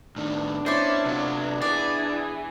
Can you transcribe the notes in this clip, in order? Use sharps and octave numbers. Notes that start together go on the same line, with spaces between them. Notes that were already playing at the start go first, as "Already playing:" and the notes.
A2 D#3 B3 D4
C#4 E4 C5 D5
C3 F#3 F4
E3 G#4 D5